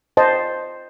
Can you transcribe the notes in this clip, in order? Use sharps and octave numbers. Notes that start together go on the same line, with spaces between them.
C5 D#5 A5